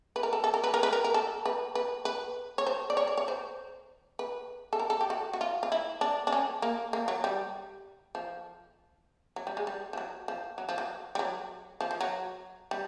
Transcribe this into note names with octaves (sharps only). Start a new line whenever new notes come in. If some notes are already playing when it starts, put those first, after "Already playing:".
B4
A#4
A4
A4
A#4
B4
A#4
B4
A#4
A#4
A4
B4
B4
B4
C#5
C5
D5
C#5
D5
C#5
C5
B4
A4
A#4
A4
G4
F#4
F#4
F4
F4
E4
D4
D4
C#4
A#3
A#3
F#3
G3
F3
F#3
G3
G#3
G3
F3
F#3
F3
F#3
F3
F#3
G3
F#3
F3
F3
F#3
G3